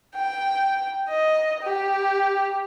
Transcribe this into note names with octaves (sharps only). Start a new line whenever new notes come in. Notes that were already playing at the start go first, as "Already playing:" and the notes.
G5
D#5
G4